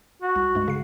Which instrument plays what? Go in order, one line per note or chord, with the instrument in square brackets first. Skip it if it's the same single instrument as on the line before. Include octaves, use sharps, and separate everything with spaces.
[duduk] F#4
[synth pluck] C2
G2 G#3
C#3 C7